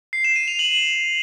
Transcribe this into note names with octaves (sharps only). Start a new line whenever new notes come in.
C7
E7
D#7
F7
F#7